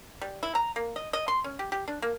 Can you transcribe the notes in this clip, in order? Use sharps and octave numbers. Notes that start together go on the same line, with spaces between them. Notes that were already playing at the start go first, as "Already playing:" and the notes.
G3
E4
A#5
A#3
D#5
D#5
C6
C#4
G4
G4
D4
A#3